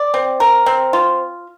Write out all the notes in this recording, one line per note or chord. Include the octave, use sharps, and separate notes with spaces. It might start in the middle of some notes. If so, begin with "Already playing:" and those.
Already playing: D5
C4
A#4
C4
F4